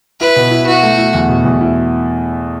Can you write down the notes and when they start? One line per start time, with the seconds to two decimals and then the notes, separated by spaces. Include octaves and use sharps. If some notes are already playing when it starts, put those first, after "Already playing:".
0.20 E4 B4
0.36 B2
0.51 E4
0.66 E4 F#4
0.83 A3
0.98 E4
1.14 E2
1.29 B2
1.45 E2
1.61 E4